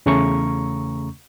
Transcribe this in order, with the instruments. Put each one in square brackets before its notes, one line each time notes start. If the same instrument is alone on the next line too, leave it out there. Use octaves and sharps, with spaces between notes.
[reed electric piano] E2 C#3 A3 C#4 A#5 C#6